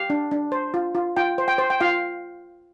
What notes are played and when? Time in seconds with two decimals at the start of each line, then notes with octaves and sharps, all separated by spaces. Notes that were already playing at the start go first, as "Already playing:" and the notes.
Already playing: G4 F5
0.10 D4
0.31 D4
0.52 C5
0.74 F4
0.95 F4
1.16 F4 G5
1.38 C5
1.48 G5
1.58 C5
1.70 G5
1.80 F4 F5